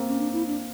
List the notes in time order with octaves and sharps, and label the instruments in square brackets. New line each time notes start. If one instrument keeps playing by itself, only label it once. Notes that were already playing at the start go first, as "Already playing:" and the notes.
Already playing: [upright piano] A#3 C4
[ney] C#4
D4
E4
D4